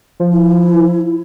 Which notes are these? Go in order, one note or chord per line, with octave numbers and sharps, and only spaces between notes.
F3
E4